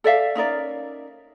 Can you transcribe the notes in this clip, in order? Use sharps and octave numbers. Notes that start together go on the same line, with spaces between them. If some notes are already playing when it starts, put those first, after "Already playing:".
A4 D5 E5 F5
C#4 D#4 A#4 D5